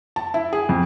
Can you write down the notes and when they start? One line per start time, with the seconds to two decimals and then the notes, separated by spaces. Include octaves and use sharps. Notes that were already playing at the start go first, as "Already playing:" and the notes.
0.16 A5
0.34 E4
0.53 G#4
0.69 F2